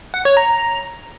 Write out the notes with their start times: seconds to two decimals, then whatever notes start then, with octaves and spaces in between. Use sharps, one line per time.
0.14 F#5
0.25 C#5
0.37 A#5